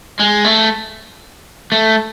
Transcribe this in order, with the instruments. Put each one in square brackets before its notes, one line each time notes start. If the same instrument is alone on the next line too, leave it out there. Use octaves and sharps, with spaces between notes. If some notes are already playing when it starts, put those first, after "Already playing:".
[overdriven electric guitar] G#3
A3
A3